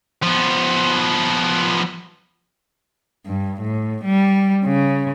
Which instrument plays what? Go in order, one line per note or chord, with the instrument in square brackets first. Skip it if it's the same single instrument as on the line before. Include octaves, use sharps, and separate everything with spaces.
[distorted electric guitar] F3 B3
[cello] G2
A2
G3
C#3